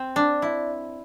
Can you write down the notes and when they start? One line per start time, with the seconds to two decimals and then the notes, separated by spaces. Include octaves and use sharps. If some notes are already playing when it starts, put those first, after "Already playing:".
Already playing: C4
0.16 D4
0.42 E4